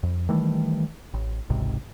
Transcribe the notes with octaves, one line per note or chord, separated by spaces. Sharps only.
F2
D#3 E3 G3 A3
A1
G#1 C#2 G#2 C3